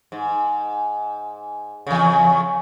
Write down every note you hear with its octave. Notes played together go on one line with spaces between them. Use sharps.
G#2
E2 C#3